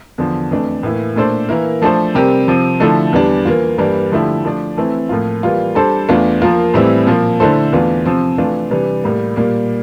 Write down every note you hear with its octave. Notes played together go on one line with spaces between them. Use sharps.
E2 D3 F3
F2 E3 A3 D4
A2 E3 A#3 E4
A#2 A3 D4 A4 C5
E3 A#3 E4 A#4
F3 A3 D4 A4 C5
C3 G3 C4 G4 A#4
C3 F3 C4
D3 F3 A3 E4 A4
E2 E3 G3 D4
E3 A#3 F4
G2 E3 G3 A#3 D4
D3 F3 A3 E4 G4
F3 A3 D4
E3 A3 C4 E4
A2 F3 A#3 F4
E3 G3 A#3 F4
G3 D4 A4 C5
E2 E3 A3 D4 F4
F3 A#3 F4 A#4
A2 E3 G3 C4 E4
A#2 F3 A#3
D3 A3 E4 A4 C5
E2 E3 A3 D4 F4
C3 F3 C4
E3 A3 D4 F4
C3 E3 G3 D4
A2 G3 A#3
A#2 G3 A#3